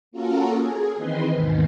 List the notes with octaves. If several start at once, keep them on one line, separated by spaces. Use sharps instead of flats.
A#3 C#4 F4 F#4 A4 A#4
G#4
D#3 E3 C4 B4 D#5 C6
D#2 G#2 B2 D#3